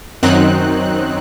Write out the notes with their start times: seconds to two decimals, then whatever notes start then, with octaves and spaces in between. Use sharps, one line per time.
0.23 F#2 D#3 F#3 C4 D#4 F#6